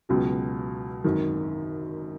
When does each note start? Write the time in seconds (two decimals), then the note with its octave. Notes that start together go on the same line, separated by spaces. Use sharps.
0.09 C#2 B2 F#3 C#4
1.04 G#1 F#2 D#3